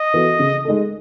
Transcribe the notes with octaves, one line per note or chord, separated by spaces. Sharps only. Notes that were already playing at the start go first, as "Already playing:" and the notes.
Already playing: D#5
E3 B3 F#4 A4
C#3
G#3 D#4 A4